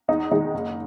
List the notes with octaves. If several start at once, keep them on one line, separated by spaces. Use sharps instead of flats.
E2 D#4
D#3 G#3 D#4
F#1